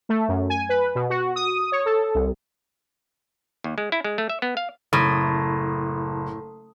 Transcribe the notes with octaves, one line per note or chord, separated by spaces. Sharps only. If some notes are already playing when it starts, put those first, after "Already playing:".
A3
F#2
G#5
B4
B2
F#4
D#6
C#5
A4
C2
D#2
G#3
E4
G#3
A3
E5
B3
F5
F#1 A2 D#6